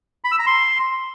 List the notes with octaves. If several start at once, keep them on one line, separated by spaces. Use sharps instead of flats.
B5
E6
A#5
C6